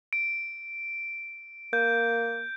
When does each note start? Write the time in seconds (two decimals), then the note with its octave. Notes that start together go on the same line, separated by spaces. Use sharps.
0.13 D7
1.73 A#3 G6